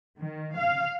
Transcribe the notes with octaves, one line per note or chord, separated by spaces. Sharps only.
D#3
F5